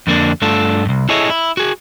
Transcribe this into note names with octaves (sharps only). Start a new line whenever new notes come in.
F2 D3 A#3 D4
G2 A3 D4 F4 A4
C2 G2
E4 G#4 A4 C#5 D#5 E5
E4
F#4 G#4